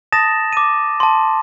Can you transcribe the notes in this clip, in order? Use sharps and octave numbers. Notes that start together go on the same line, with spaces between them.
A5 D#6 A6 A#6 E7
D6 D#7
A5 C6